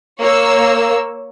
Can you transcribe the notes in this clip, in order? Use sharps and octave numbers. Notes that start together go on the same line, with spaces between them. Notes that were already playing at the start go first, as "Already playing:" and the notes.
A#3 C#5 E6